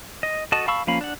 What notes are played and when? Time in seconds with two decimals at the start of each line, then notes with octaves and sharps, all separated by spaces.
0.23 D#5
0.52 F#4 A4 D#5 A5
0.68 F5 A5 B5 C#6 E6
0.87 F3 A#3 C#4 F5 B5
1.01 D4 F#5